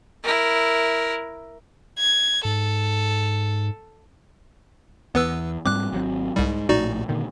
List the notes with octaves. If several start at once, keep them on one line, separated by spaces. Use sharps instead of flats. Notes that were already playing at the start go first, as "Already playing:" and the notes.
E4 A#4
G#6
G#2 A4
E2 B3 B4 E6
G#2 G3 C4 D6 F#6
G#1 F#3 C4
C2 G#2 G3
A#1 A2 D#4 F#4 D5
A#2 D3 D#3